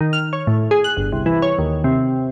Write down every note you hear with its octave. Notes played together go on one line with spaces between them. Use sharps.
D#3
F6
C#5
A2
G#4
F#6
G1
C2
E3
C#5
D#2
C3